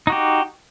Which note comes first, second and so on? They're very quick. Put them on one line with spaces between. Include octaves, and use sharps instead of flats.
D#4 F#4 G4